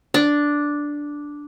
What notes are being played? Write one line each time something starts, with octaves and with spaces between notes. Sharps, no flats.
D4